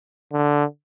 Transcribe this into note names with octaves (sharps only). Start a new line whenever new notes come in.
D3